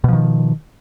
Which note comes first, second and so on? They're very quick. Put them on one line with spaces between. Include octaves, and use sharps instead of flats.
B2 F3 D#3